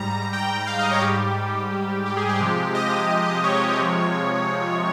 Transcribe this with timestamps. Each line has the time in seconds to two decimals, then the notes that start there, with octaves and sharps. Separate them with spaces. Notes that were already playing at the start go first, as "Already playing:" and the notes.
Already playing: G#2 G3 A#5
0.33 G5
0.67 F5
0.79 D#5
0.91 C#5
1.02 G#2 G3 G4
2.06 G4
2.17 G#4
2.29 G4
2.40 C3 F3 G#3
2.75 D#5
3.44 C#5
3.79 C3 F3 G#3